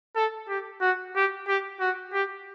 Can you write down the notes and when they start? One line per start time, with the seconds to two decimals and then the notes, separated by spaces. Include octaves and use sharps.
0.16 A4
0.48 G4
0.81 F#4
1.15 G4
1.48 G4
1.80 F#4
2.13 G4